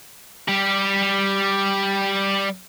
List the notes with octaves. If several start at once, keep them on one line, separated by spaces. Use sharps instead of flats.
G3 G4